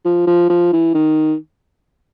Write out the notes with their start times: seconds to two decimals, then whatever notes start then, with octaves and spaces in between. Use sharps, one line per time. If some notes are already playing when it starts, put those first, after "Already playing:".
0.05 F3
0.27 F3
0.49 F3
0.73 E3
0.94 D#3